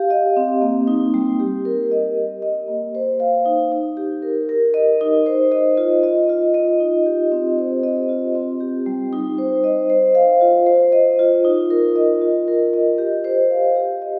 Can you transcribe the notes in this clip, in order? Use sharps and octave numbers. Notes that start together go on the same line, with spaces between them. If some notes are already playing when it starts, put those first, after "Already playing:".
Already playing: G4 F5
D#5
C4
A#3
D#4
G3
G4
A#4
D#5
G4
D#5
A#3
C5
F5
D#4
D#4
G4
A#4
A#4
D#5
D#4
C5
D#5
F4
D#5
F4
D#5
D#4
G4
C4
C5
D#5
F4
C4
G4
G3
D#4
C5
D#5
C5
F5
F4
C5
D#5
F4
D#4
A#4
D#5
F4
A#4
D#5
G4
C5
F5
G4
D#5